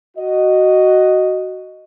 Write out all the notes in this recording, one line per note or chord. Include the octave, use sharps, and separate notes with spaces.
F#4 D#5